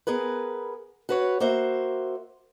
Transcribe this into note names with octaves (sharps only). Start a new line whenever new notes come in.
B3 G#4 A#4 B4
F#4 B4 C#5
A#3 F#4 C5 E5